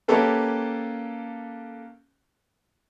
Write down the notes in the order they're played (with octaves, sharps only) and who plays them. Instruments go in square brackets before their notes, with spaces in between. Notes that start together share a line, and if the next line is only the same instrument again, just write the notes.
[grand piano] A#3 C#4 G4 A4 B4